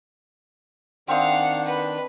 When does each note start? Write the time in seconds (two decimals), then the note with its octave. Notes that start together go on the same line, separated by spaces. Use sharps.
1.08 D#3 C4 D4 F5 F#5 D#6
1.67 B4